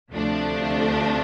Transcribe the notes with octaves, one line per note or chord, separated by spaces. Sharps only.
D2 C3 F3 A3 D4